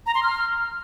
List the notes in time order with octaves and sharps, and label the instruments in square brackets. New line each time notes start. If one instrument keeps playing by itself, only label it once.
[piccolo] A#5
C6
F6